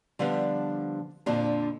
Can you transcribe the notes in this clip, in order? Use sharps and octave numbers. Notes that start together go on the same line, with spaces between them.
D3 F3 G3 B3 D4
F2 A#2 D3 F3 D4